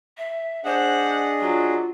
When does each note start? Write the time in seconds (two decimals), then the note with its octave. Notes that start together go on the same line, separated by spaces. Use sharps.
0.18 E5
0.65 D4 G#4 C5 D#5 F#5
1.41 F#3 F4